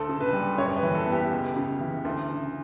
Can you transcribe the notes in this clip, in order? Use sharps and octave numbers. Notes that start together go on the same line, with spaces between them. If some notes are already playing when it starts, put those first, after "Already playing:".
Already playing: D2 A4
C#3
B4
G3
F#2 C#5
B4
E3
A4
B3
G4
C#2
C#3
E3
D2
C#3